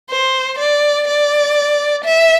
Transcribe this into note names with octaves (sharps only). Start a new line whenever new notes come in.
C5
D5
D5
E5